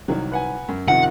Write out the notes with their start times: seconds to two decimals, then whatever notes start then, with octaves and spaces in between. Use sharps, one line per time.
0.08 C2 D#3 F#3
0.32 B4 F#5 G#5
0.68 F#2
0.88 C3 D#3 F3 F#5